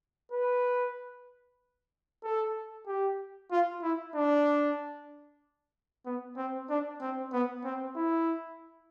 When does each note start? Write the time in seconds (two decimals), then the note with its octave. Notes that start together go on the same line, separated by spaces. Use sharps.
0.32 B4
2.24 A4
2.87 G4
3.51 F4
3.83 E4
4.15 D4
6.06 B3
6.37 C4
6.70 D4
7.01 C4
7.33 B3
7.64 C4
7.96 E4